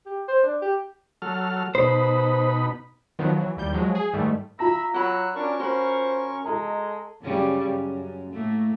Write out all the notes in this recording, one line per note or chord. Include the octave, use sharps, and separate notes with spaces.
G4
C5
D4
G4
F#3 A4 F6
B2 D#4 C5 B5
D#3 F3 F#3 B3
E3 F#3
D#2 G3 G6
F3 F#3 G#3
G#4
G#2 D#3 G3 A3
F4 E5 A#5 B5 E6 A#6
F#3 F#4 B5 E6 F#6
C#4 D4 A#4 C#6
F#4 C5 B5
G#3 A4 D#5 A#5
F#2 C#3 G3
F#2
A2 A3 A#3